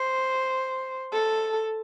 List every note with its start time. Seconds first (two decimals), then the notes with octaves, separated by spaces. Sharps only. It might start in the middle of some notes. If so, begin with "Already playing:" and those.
Already playing: C5
1.13 A4